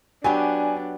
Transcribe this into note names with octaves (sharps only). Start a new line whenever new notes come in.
F#3 B3 D4 G4 G#5